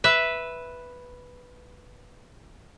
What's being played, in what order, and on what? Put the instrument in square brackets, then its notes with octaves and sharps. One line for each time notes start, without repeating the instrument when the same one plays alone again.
[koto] B4 E5